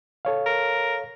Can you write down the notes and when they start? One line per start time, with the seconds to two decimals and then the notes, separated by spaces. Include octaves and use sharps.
0.25 A4 C#5 F5
0.46 A#4